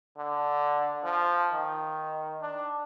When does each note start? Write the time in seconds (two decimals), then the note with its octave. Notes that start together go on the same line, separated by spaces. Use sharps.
0.18 D3
1.04 F3
1.53 D#3
2.42 D4